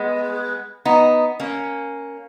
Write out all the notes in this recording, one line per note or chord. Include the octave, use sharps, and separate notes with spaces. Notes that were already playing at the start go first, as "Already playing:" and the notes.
Already playing: G#3 B3
B3 D#4
A#3 C#4